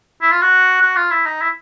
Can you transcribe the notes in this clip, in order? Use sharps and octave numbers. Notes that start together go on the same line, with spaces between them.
E4
F4
F#4
F#4
F4
E4
D#4
E4